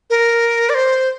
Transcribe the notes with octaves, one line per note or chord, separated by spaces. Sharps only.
A#4
D5
C5